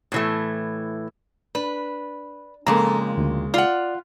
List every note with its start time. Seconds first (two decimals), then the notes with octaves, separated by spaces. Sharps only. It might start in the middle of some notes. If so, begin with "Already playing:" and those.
0.12 A2 E3 A3
1.55 D4 B4
2.67 F2 A#2 C#3 G#3 A#3 A4 A#5
3.17 D2
3.54 F4 D5 F#5